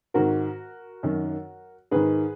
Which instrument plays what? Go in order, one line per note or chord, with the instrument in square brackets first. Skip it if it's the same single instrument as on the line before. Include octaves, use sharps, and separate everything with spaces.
[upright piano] G#2 D#3 F#4 A#4
F#2 D#3
G#2 D#3 G#4 B4